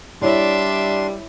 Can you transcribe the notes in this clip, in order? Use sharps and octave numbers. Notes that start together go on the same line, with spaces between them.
G3 D4 E4 C#5 D5 E5 C6